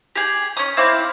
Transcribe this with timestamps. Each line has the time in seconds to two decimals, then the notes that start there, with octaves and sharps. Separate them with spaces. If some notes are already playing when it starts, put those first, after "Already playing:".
0.16 G4 G#4
0.57 C#4 D#6
0.77 C4 E4 F5 D6